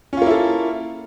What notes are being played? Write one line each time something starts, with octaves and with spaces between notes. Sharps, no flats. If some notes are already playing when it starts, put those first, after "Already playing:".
A#3 C#4 E4 F4 A4